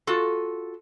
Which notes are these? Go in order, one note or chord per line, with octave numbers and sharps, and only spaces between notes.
F4 F#4 A4